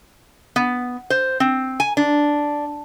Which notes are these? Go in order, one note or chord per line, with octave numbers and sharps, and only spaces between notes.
B3
C5
C4
G#5
D4